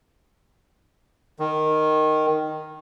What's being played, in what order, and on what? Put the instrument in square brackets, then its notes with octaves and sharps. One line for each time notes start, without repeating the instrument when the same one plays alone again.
[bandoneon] D#3